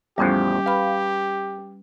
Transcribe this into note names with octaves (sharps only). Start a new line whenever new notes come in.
E2 A2 F3 G3 C#4 G4 F#6
B4 F5 B5